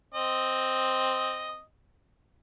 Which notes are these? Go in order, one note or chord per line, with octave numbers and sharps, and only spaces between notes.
C4 D#5